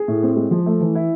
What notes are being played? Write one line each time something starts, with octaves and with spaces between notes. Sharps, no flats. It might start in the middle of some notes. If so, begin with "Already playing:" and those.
Already playing: G#4
A2
C4
G#3
F3
A3
E3
E4